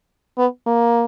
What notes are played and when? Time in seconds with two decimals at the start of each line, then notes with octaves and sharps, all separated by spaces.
0.38 B3
0.67 A#3